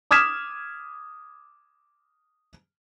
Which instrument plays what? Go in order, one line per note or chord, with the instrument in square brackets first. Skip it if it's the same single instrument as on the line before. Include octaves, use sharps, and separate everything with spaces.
[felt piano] D6 D#6 F6 G#6 B6 E7